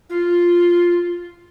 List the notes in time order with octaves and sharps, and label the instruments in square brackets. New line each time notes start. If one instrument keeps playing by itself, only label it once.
[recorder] F4